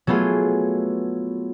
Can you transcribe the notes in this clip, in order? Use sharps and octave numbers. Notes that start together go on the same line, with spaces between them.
F#3 A3 B3 F4 G#4